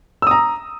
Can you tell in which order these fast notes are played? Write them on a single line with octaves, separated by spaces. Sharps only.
E6 D#6 A#5